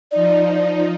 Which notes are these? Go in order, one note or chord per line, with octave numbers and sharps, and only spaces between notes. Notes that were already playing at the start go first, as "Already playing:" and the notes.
F3 D#4 D5